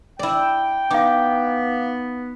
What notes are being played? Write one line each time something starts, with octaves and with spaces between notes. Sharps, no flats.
E4 D5 G5
B3 D#4 F5 D6